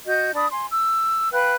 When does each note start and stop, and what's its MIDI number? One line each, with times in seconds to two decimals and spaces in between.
0.06 0.31 66
0.06 0.31 75
0.06 0.31 91
0.34 0.46 62
0.34 0.46 74
0.34 0.46 83
0.34 0.46 87
0.51 0.65 80
0.51 0.65 84
0.71 1.30 88
1.31 1.54 71
1.31 1.54 77
1.31 1.54 79
1.31 1.54 90